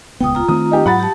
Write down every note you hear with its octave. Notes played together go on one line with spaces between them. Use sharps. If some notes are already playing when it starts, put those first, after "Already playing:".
D#1 C#2 B3 G5 D#6
F4 A#5
D#3 A3 C4 D#6
D#4 G4
G#2 F#3 F#5 B5 A6
G4 A5